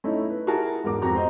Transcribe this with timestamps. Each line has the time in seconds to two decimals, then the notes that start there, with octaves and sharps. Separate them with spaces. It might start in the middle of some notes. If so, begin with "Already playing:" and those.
0.04 A3 C#4 D#4 E4
0.30 B4
0.47 E4 F#4 G#4 A#4 A5
0.84 E2 G#2 A#4 D6
1.02 F2 C4 F#4 A#5
1.15 C5 D#5 A#5